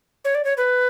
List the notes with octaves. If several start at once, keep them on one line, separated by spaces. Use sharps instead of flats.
C#5
D5
C#5
B4